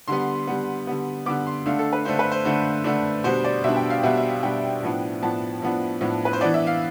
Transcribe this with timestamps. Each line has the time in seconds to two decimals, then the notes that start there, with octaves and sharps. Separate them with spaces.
0.08 D3 G3 B3 C6
0.47 D3 G3 B3
0.87 D3 G3 B3
1.26 D3 G3 B3 D6
1.47 C6
1.66 D3 A3 D4 F5
1.79 A4
1.93 B4
2.05 D3 A3 D4 C5
2.19 B4
2.32 C5
2.45 D3 A3 D4
2.84 D3 A3 D4
3.24 B2 G3 B3 D4 C5
3.44 D5
3.64 B2 G3 B3 D4 E5
3.76 G5
3.90 F5
4.03 B2 G3 B3 D4 E5
4.17 E5
4.30 F5
4.43 B2 G3 B3 D4 G5
4.82 A2 F3 B3 D4
5.22 A2 F3 B3 D4 A5
5.62 A2 F3 B3 D4
6.01 A2 F3 B3 D4
6.25 B4
6.33 C5
6.41 E3 B3 D4 D5
6.54 E5
6.67 F5